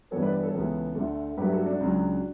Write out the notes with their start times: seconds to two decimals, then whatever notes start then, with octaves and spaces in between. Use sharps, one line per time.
0.11 G2 E3 G3 B3 A4 C#5
0.22 B4 D5
0.32 B4 D5
0.43 A4 C#5
0.53 C#2 C#3 E3 B3
0.95 D2 D3 A3
1.37 G2 F#3 A3 G4 B4
1.52 F#4 A4
1.66 D4 F#4
1.80 C#2 C#3 F#3